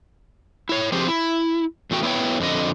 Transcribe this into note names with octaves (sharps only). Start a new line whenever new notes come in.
E4 C#5
F3 C4 G4 G#4 C5
E4
E2 A3 F#4 G5
B3 E4 C5 C#5 G5
F2 D3 D#5